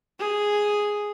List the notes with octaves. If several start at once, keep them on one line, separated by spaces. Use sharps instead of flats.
G#4